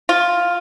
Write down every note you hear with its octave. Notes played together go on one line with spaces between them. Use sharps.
F4